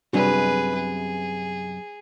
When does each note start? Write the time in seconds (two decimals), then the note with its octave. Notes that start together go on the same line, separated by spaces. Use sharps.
0.13 F#2 C3 G3 B3 D4 F#4 G#4 B4
0.75 G#4